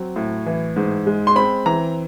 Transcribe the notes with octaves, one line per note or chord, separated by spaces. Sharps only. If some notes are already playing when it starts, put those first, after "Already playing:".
Already playing: F#3 C4
A2
E3
G#2
G#3
C6
C4 B5
E3 A#5